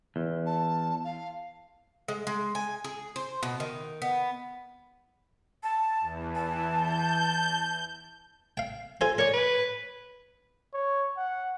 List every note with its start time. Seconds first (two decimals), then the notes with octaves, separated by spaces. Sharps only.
0.16 E2
0.45 A5
1.04 F5
2.08 G#3
2.27 G#3
2.55 G#5
2.84 G#4
3.16 C5
3.43 B2
3.60 D#3
4.02 B3
5.63 A5
6.01 E2
6.35 E3 A5
6.76 G6
8.57 F5 G5
9.01 F4 A4 C5 G#5
9.18 A#4 C#5 D5
9.33 B4
10.74 C#5
11.17 F#5